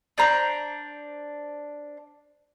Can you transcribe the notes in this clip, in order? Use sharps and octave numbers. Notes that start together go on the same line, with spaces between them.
D4 C5 A#5 G6